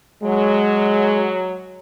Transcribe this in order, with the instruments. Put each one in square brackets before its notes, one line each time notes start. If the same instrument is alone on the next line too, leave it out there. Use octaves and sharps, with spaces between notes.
[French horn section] F#3 [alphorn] G#3